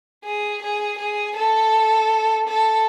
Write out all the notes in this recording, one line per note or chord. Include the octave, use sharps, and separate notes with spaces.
G#4
G#4
G#4
A4
A4